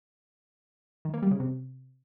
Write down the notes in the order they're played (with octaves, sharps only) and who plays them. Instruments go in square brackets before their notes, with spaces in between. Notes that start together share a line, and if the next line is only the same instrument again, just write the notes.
[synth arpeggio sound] D#3
A#3
G3
C#3
C3